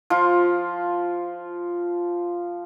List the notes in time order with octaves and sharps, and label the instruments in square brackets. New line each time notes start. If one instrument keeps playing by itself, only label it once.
[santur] F3 F4